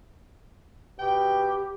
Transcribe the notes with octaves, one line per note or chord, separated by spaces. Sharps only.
B2 G4 G5